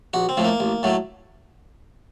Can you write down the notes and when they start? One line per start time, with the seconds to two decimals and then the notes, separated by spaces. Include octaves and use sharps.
0.14 A#1 F#4
0.29 C4
0.37 A2 F3 A3
0.44 A#3
0.60 A1
0.83 A2 F#3 A3